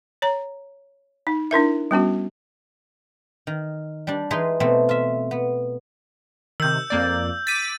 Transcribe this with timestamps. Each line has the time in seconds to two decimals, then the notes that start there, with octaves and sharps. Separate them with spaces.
0.22 C#5 A#5
1.27 D#4
1.51 D4 E4 A#4 E5
1.91 G3 B3 C#4 F#4
3.47 D#3
4.07 G3 D4
4.31 E3 G#3 D#4 G#4 B4 C6
4.60 B2 A3 C4
4.89 F4 E5
5.31 B3
6.60 C3 D#3 E6 G6
6.90 F2 A#3 D5
7.47 D6 A6 B6 D#7